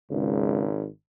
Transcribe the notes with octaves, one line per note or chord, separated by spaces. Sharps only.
G#1 C#2